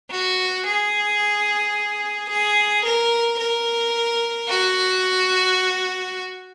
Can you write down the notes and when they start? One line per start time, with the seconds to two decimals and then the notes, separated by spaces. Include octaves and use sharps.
0.11 F#4
0.66 G#4
2.29 G#4
2.84 A#4
3.39 A#4
4.48 F#4